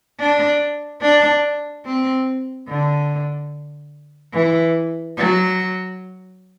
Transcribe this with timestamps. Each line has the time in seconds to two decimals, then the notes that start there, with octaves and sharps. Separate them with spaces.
0.20 D4
1.02 D4
1.85 C4
2.69 D3
4.33 E3
5.17 F#3